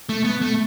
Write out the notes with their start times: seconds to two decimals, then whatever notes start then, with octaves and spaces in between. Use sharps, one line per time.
0.09 A3
0.24 B3
0.41 A3